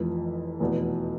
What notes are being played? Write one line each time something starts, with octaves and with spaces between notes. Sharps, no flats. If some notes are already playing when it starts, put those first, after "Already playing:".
Already playing: F1 F2 E3
F1 E2 B2